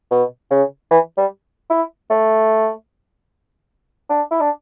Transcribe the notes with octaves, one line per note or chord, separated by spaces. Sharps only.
B2
C#3
E3
G3
E4
A3
D4
E4
D4